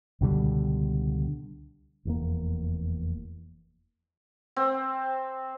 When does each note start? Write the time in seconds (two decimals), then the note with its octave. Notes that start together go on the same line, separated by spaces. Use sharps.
0.21 C#2 B2 D3 G3
2.05 F1 E2 A#3
4.56 C4